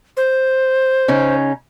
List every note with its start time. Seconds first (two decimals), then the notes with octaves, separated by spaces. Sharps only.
0.17 C5
1.08 C#3 C#4 D#4